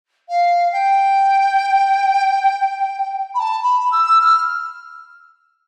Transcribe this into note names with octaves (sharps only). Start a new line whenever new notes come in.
F5
G5
B5
A5
B5
E6
F6